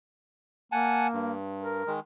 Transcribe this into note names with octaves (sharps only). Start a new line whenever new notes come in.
A#3 F#5 G#5 A5
G2
A#4
D#3 G#3